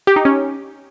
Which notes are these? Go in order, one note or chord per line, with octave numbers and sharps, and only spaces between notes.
G4
D#4
C#4